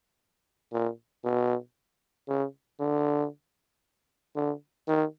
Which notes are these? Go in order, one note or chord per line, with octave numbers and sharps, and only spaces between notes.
A#2
B2
C#3
D3
D3
D#3